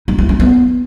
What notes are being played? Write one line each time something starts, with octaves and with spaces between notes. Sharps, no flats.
D#4
E4
C#4
B3